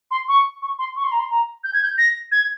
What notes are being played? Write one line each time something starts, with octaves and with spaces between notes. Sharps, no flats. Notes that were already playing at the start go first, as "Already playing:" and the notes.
C6
C#6
C#6
C6
C#6
C6
A#5
C6
A#5
G6
G#6
G6
A#6
G#6